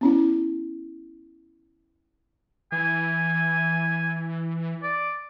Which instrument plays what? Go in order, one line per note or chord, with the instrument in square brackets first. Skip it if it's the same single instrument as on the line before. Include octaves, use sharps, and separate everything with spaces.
[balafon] B3 C#4 E4
[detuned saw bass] E3 [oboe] G#5
[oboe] D5